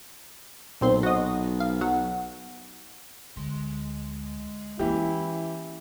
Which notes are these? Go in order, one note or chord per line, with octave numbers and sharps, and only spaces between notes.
B1 A#2 C4 C6
F#4 D#5
F5
F#3 F#5
D2 G#3 C6
E3 A#3 C#4 E4 G4